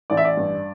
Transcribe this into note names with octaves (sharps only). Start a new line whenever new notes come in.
A1 D5
E5
D5
G2